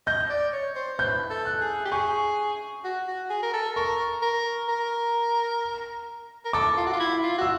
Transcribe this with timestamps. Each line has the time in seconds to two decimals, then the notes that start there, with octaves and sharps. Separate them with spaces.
0.07 D#5 G6
0.30 D5
0.53 C#5
0.76 C5
0.99 B4 G6
1.30 A4
1.45 F#6
1.61 G#4
1.85 G4
1.91 G#4 C#6
2.84 F#4
3.07 F#4
3.30 G#4
3.43 A#4
3.53 A4
3.76 A#4 C#6
4.22 A#4
4.69 A#4
6.45 A#4
6.53 A4 D6
6.77 F4
6.86 F#4
6.93 F4
7.00 E4
7.23 F4
7.38 F#4 E6